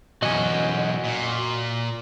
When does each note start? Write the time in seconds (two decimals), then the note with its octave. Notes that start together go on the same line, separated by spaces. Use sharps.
0.22 B1 E2 F#4 D#5 G#5
1.04 A#2